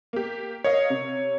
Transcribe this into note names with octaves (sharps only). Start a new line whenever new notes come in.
A#3 G4
A#4 C#5 D#5 F5
C3